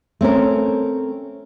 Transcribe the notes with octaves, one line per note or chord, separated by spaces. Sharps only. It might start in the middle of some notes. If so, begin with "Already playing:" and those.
A3 C4 C#4 A#4